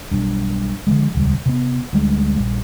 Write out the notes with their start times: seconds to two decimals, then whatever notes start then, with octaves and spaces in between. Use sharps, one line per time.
0.12 B1 G2
0.87 D3 E3 F3 G#3
1.15 D#1 C#2 G3
1.46 C3 B3
1.93 D2 G3 G#3
2.37 A#1 G2